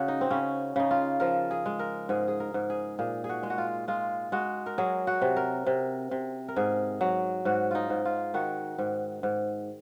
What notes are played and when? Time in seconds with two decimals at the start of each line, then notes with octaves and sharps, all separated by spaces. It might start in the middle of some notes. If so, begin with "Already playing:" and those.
Already playing: C#3 F#4 G#4
0.08 D#4
0.21 C4
0.31 C#3 C#4
0.76 C#3 D#4
0.91 F4
1.20 F3 A#4
1.51 G#4
1.66 G#3
1.79 A#4
2.09 G#2 G#4
2.28 G#4
2.40 A#4
2.54 G#2
2.70 G#4
2.99 A#2 G#4
3.24 G#4
3.29 F#4
3.43 G#3
3.50 F#4
3.58 F4
3.88 G#3 F4
4.32 G#3 F#4
4.66 A#4
4.78 F#3 G#4
5.07 F#4
5.21 C3
5.36 A#4
5.66 C3
6.11 C3
6.48 A#4
6.56 G#2 G#4
7.01 F#3
7.45 G#2 F#4
7.71 D#4 F4
7.90 G#2
8.05 F4
8.34 D#3 F#4
8.79 G#2
9.23 G#2